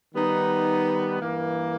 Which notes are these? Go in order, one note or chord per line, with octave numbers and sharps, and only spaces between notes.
D#3 G3 B3 D#4
G2 E3 A#3